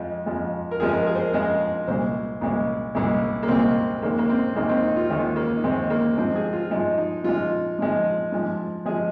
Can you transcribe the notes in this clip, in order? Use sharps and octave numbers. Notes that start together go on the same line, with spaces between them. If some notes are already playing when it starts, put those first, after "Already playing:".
Already playing: F2 F3 G#3
F2 F3 G#3
A#4
F2 F3 G#3 G#4
A#4
G#4
C5
A#4
F2 F3 G#3 D#5
C2 A#2 G#3 C5
C2 A#2 G#3
C2 A#2 G#3
A#3
C2 A#2 G#3 C4
D#2 D#3 G#3 A#3
A#3
C4
D#2 D#3 G#3 A#3
C4
D#4
F4
D#2 D#3 G#3 D#4
A#3
D#4
D#2 D#3 G#3 C4
A#3
G#2 F3 G#3 C4
G#4
F4
G#2 F3 G#3 D#4
D#4
G#2 F3 G#3 F4
G#2 F3 G#3
G#2 F3 G#3
F3 G#3 G#4